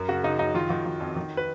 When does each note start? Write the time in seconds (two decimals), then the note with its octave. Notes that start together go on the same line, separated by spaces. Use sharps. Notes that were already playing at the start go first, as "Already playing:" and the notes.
Already playing: F#2 A#4
0.08 C#3 F#4
0.24 C#3 D#4
0.39 F#2 D#4
0.54 D#3 F4
0.69 D#3 F#4
0.86 D#3
1.00 F2
1.16 D#3
1.37 B4